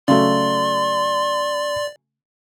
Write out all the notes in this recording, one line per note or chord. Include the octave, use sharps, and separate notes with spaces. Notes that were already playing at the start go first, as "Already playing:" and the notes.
C#3 F#3 A3 D5 C6